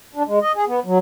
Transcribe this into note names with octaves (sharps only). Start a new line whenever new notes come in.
D4
G#3
D#5
G#4
B3
F#3